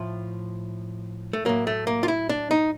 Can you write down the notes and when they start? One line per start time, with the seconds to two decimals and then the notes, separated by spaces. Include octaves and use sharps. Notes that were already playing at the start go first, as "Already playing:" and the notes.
Already playing: A2 F3
1.33 A3
1.45 A2 F#3 A#3
1.67 A3
1.87 A#3
2.03 F4
2.08 E4
2.29 D4
2.51 D#4